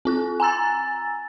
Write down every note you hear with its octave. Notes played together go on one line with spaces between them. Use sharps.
C4 F4 F#6
G#5 A#5 E6 A6